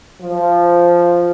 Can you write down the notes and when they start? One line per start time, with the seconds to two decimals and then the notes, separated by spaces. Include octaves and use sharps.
0.21 F3